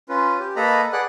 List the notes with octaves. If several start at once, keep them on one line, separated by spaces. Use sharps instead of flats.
C#4 F4 B4
G4
A#3 A4 B4 D#5 A#5 B5
G#4 B4 D5 F#5 F#6